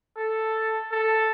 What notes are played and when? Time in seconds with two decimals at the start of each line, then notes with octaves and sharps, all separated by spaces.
0.17 A4
0.91 A4